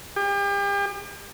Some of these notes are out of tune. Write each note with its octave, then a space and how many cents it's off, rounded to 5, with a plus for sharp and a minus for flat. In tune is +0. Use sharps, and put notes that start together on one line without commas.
G4 +40